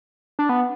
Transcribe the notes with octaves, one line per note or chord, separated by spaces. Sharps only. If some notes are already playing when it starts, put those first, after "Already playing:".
D4
B3